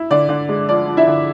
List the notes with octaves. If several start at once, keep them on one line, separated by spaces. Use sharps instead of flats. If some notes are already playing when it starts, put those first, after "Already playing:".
Already playing: E4
D3 D5
D3
G#3
F3 D5
F3
E4 E5
D3